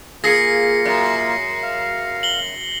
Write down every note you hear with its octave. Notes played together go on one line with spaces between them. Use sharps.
A#3 F4 G#4 A#6 C7 C#7
F#2
F5
F#7 G7